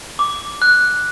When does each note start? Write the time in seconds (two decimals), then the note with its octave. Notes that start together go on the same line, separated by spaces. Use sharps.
0.19 D6
0.62 F#6